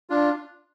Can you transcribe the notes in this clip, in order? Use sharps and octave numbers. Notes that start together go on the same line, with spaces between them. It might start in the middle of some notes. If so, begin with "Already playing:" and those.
D4 F4